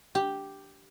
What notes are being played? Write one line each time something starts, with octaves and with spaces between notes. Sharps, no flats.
G4